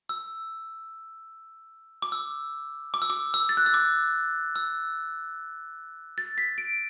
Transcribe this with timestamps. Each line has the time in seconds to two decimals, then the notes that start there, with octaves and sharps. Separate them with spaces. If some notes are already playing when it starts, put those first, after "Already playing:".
0.09 E6
2.02 D6
2.12 E6
2.94 D6
3.02 E6
3.10 D6
3.34 E6
3.49 A6
3.57 F#6
3.66 E6
3.74 D6
4.56 E6
6.18 A6
6.38 B6
6.58 D7